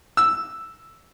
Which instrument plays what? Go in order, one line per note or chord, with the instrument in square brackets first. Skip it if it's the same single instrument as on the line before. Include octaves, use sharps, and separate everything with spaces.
[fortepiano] E6